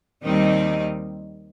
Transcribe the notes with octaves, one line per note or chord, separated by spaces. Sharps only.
D#2 D#3 G3 C4 D#4